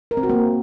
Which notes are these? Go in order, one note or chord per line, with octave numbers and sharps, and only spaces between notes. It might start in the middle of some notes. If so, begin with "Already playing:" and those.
A#4
C4
F#4
A#3